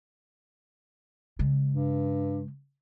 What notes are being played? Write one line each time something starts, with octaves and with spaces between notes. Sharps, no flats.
C#3 G#3
G2